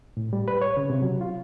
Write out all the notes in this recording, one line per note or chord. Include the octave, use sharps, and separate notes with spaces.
A2
G3
B4
C#5
C#3
C3
F#3
F4